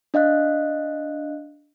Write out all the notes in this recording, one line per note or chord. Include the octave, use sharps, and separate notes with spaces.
D4 D#5 F5 F#6